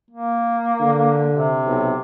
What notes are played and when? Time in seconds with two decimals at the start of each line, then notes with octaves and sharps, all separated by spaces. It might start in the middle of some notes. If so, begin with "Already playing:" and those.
0.11 A#3
0.80 D3
1.33 C3
1.66 B1